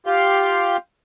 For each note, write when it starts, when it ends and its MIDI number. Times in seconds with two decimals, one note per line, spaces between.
0.06 0.77 65
0.06 0.77 67
0.06 0.77 77
0.06 0.77 84